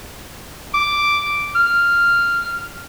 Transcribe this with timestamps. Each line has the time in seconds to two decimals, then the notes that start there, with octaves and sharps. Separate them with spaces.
0.74 D6
1.55 F6